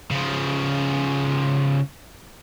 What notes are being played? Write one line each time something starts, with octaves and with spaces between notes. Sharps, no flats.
C#3 F3